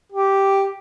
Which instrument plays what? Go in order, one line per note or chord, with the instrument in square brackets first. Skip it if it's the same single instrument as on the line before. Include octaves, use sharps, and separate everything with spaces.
[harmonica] G4